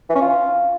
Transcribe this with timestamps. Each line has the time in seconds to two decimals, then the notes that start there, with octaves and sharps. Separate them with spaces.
0.09 E3
0.15 C#4
0.21 F4